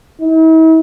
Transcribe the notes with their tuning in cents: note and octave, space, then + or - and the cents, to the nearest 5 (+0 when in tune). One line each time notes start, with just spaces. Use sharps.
E4 -45